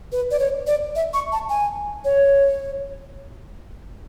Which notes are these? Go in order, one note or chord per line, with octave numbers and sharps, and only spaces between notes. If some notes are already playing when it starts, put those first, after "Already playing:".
B4
D5
C#5
D5
E5
C#6
A5
G#5
C#5